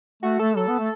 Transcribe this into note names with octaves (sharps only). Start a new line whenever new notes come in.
A3 F#4
A3 A4
F#3 A4
B3
A3